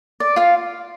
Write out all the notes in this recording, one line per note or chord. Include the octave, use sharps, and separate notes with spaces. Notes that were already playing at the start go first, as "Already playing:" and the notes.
D5
F4 F5